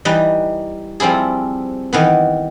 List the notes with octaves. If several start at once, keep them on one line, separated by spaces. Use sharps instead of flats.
E3 G3 D#4 B4
F3 G3 C4 E4 G#4
D#3 E3 B3